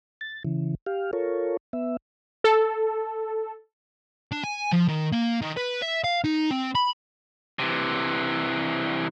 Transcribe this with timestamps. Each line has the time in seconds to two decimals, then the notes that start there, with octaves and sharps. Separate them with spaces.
0.21 A6
0.44 C#3 E3
0.87 G4 F5
1.13 F4 A4 A#4 C#5
1.73 B3 E5
2.44 A4
4.32 D4
4.44 G#5
4.73 F3
4.88 D#3
5.12 A#3
5.41 D#3
5.57 B4
5.82 E5
6.04 F5
6.24 D#4
6.51 C4
6.75 B5
7.59 C3 E3